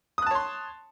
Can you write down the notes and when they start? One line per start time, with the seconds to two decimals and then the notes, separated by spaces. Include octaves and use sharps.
0.18 D#6
0.22 F#6
0.27 A5
0.31 C#5
0.35 C6